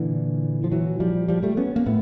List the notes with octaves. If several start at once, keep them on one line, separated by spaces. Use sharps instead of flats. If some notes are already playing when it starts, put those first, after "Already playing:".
Already playing: A#2 D3 E3
F3
E3 F#3
F3 G3
F3 G3
G3 A3
B3 C#4
A#3
A2 A3 B3